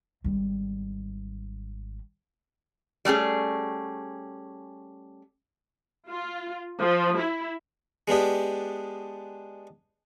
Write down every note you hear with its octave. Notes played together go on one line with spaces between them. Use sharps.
G#1 G3
G3 A3 C#4 G#4
F4
F3
E4
G#3 B3 D4 G4